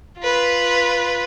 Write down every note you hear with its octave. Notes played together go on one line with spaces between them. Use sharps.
F4 B4